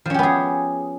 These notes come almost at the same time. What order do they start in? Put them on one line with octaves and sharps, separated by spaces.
F3 C#4 G4 B3 G#4